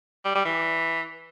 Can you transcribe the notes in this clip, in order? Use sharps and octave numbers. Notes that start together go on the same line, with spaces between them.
G3
G3
E3